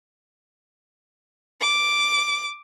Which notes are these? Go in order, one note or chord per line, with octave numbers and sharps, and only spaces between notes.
D6